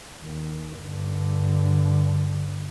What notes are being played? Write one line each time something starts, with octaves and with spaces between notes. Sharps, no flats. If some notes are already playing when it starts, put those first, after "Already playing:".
D#2
G2 D3